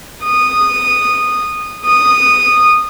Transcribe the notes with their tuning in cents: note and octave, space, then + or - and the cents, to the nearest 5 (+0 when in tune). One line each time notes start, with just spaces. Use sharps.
D#6 -15
D#6 -15